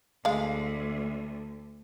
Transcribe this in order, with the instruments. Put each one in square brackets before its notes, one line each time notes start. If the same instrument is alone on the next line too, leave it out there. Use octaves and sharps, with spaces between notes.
[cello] D2 [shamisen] G#3 F5